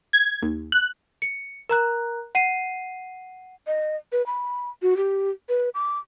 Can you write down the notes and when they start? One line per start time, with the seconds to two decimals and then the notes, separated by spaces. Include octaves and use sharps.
0.13 G#6
0.42 D#2
0.72 F#6
1.22 C#7
1.69 A#4 A#5 F#6
2.35 F#5 C7 D#7
3.67 D#5
4.12 B4
4.26 B5
4.82 F#4
4.97 G4
5.49 B4
5.74 D6